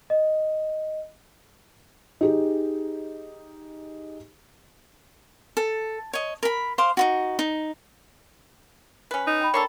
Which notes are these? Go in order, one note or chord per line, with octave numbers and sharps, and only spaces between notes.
D#5
D#4 G4 G#4
A4
C#5 D#5
A#4 B5
C5 F5 C6 D6
D#4 F4 F#4
D#4
C#4 B4
D#4
G5 B5
A#3 D4 A4 C#5